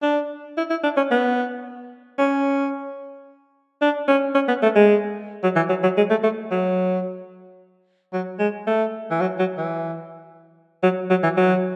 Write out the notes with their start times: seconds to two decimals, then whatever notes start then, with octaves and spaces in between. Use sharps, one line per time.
0.02 D4
0.58 E4
0.70 E4
0.83 D4
0.97 C#4
1.11 B3
2.19 C#4
3.82 D4
4.08 C#4
4.35 C#4
4.48 B3
4.62 A3
4.76 G#3
5.43 F#3
5.56 E3
5.69 F#3
5.83 F#3
5.97 G#3
6.10 A3
6.23 A3
6.51 F#3
8.13 F#3
8.39 G#3
8.67 A3
9.11 E3
9.21 F#3
9.39 F#3
9.58 E3
10.83 F#3
11.10 F#3
11.23 E3
11.37 F#3